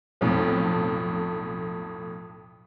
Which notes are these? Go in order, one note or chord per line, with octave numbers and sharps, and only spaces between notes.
B1 F2 A2